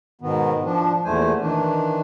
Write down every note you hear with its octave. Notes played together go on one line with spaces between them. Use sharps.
G#2 B2 D#3 B3
F3 D4
E2 A#2 A3 C5 G#5
D#3 E3 D4